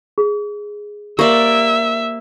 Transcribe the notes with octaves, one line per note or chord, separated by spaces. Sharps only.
G#4
A#3 G4 C5 D5 E5